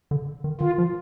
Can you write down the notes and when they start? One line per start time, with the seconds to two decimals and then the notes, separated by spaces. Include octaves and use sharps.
0.11 D3
0.44 D#3
0.61 D#3 F4
0.78 F3